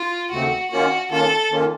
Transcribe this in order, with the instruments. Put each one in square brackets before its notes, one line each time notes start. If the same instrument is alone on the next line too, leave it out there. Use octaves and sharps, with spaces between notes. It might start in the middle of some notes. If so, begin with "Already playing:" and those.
Already playing: [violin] F4
[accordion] D#2 C#3 A3 C4 [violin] F#4
[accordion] D#3 A#3 C#4 F4 [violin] F#4
[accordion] D#3 A#3 C#4 F4 [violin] A4
[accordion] D#3 A#3 C#4 F4